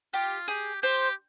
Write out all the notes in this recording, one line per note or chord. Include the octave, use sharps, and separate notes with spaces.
F4 G4
G4 G#4
G4 C5